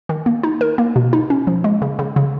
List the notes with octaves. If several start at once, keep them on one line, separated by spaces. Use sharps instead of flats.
D#3
A#3
D#4
A#4
A#3
B2
D#4
C#4
F3
G#3
C#3
C#3
C#3